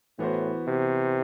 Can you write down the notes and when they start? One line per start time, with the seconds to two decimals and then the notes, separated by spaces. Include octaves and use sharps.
0.19 A2 E3 B3 F#4 C5
0.67 C3